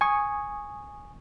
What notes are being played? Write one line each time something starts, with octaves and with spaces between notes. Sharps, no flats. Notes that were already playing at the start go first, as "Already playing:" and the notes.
G#5 C#6 D#6